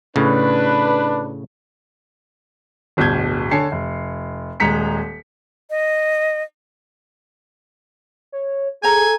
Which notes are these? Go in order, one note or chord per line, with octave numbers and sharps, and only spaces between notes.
A2 C#3 D4 B4
D1 G1 B2 A5 G6 G#6
D3 C#5 G#5 A5 C7 C#7
F1
D#1 G#3 A#5 B6 C#7
D#5
C#5
G#4 A4 C5 G#5 A#5